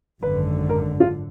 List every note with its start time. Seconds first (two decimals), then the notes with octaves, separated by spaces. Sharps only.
0.22 G#1 F#2 D3 B4
0.69 A#4
1.00 F4